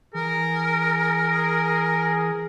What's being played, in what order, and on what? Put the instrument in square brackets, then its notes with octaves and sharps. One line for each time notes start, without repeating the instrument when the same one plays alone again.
[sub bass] E3 [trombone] G#4 [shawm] A#4